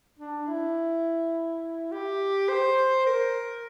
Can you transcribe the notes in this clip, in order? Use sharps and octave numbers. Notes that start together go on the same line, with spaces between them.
D4
E4
G4
C5
A#4